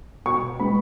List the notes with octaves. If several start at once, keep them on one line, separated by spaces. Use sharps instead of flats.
B2 C#6
G#3 B3 B5